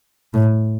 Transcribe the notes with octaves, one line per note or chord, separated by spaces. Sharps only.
A2